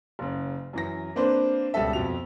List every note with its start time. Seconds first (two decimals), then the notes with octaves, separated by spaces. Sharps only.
0.19 F#1 C#3
0.73 F#2 E3 A#6
1.16 A#3 C4 D4 B4 C5
1.74 C#2 B2 G3 F#4 A4 E5
1.93 F2 B2 F7